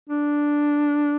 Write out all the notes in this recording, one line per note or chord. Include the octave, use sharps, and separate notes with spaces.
D4